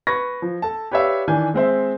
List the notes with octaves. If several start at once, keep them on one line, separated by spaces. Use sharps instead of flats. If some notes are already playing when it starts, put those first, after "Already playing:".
B4 C#6 G#6 A#6
F3
A4 A5
G4 B4 C#5 D5 E5 F5
D#3 E3 D4 G#5 G6
G#3 C4 C5 E5